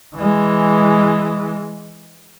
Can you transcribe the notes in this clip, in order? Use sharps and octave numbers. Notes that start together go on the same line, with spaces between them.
E3 G#3